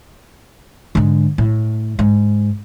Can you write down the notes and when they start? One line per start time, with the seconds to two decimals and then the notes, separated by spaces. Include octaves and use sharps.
0.95 G#2 D3
1.38 A2
1.99 G#2